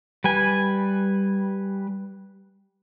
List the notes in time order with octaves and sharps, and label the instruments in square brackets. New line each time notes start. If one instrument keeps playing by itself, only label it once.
[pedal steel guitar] G3 B4 G#5